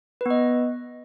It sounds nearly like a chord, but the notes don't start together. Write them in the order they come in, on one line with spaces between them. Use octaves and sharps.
B4 B3 D#5